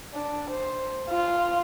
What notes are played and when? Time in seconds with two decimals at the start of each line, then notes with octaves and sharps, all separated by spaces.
0.14 D4
0.50 C5
1.10 F4